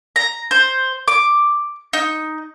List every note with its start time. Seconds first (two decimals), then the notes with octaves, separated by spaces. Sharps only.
0.16 A#5
0.51 C5
1.08 D6
1.93 D#4